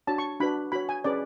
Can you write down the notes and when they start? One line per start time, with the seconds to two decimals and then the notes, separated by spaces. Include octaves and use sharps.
0.07 D4 F#4 C#5 A5
0.18 C#6
0.40 D4 F#4 B4 B5
0.72 F#4 C#5 B5
0.89 G#5
1.04 C#4 G#4 B4 D5